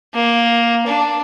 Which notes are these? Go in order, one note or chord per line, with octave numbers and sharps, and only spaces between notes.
A#3
D4